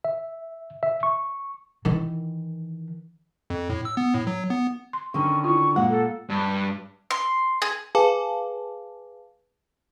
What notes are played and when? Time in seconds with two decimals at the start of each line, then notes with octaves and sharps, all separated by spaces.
0.05 E5
0.83 E5
1.03 C#6
1.85 D#3 E3
3.50 F2
3.70 A2
3.85 E6
3.97 B3
4.14 A2
4.27 F#3
4.50 B3
4.93 C6
5.14 D3 D#3 C#4 C#6
5.44 E4 F4 C#6
5.76 A#2 G#3 F#5
5.89 A4
6.29 G2
7.11 C6
7.62 G#4
7.95 G#4 B4 F5 G#5 A5 D6